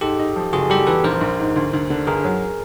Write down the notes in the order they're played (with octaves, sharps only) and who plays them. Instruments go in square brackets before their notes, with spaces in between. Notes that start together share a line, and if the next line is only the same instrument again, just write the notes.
[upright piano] G#2 [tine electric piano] G4 A4
[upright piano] D#4
F3
[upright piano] F#1 [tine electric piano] F#4 G#4
[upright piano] G3 [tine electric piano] G4 A4
[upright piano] E2 [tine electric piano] A4 B4
[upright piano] A#1 [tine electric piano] A#4 C5
[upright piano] A#1
G#2
D2
D2
D3
[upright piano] G1 [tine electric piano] G#4 A#4
[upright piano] F#3